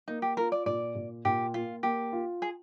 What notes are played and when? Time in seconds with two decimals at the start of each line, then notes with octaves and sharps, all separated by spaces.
0.08 A#3 D#4
0.22 G4
0.37 F4 A#4
0.52 D5
0.66 A#2 D5
0.95 A#2
1.25 A#2 G4
1.54 A#3 F4
1.83 A#3 G4
2.12 F4
2.42 G#4